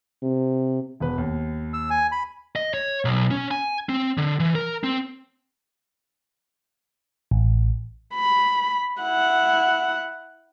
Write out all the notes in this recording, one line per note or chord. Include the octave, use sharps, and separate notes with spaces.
C3
E1 B4
D#2
E6
G#5
B5
D#5
C#5
B1
C#4
G#5
C4
D3
E3
A#4
C4
A1
B5
E4 F#5